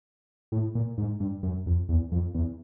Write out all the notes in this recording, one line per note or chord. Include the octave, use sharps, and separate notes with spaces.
A2
A#2
G#2
G2
F#2
F2
E2
F2
E2